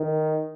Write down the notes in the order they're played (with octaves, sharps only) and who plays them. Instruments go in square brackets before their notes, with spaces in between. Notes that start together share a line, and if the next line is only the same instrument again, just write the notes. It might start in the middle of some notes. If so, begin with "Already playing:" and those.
Already playing: [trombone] D#3